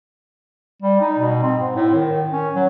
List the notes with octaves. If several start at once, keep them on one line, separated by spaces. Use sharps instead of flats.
G3
D#4
B2
C4
G#2
A2
D#3
C#4
F#3